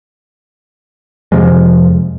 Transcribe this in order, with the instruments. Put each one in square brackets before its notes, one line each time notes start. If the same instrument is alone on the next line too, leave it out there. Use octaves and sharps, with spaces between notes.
[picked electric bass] F2 C3 F3 G#3